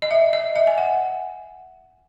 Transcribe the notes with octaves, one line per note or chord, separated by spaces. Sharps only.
D#5
E5
D#5
E5
G#5
F#5